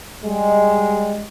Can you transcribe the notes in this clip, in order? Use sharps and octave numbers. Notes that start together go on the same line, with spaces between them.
G3 G#3